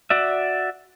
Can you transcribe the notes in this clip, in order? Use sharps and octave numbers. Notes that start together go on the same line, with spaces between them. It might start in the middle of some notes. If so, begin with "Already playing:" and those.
F#4 D5 E5